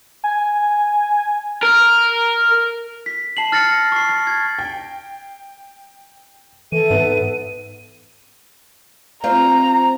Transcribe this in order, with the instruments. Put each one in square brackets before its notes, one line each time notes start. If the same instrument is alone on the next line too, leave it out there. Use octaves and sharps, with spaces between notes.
[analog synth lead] G#5
[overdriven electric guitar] A#4
[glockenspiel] B6
A5 C7 F#7
F6 A6 A#6 C7 C#7
C#6 C7
A6
G#6
[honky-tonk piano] G5
[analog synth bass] E3 [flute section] A4 E5 [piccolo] D#7
[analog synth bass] G#2 [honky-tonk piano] B3
[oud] C4 F4 [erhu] A#5